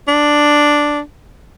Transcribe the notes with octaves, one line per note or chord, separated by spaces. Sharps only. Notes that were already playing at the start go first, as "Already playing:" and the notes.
D4